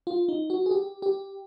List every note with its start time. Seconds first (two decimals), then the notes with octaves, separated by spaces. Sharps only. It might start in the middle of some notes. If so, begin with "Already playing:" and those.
0.07 F4
0.28 D#4
0.50 F#4
0.66 G#4
0.71 G4
1.02 G4